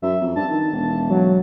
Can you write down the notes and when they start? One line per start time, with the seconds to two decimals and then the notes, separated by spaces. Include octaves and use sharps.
0.02 F#2 E5
0.21 F2
0.36 G2 A5
0.50 D#3
0.73 E1
1.10 F#3